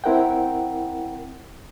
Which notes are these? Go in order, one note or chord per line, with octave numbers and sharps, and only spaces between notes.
C4 E4 A#4 F#5 G5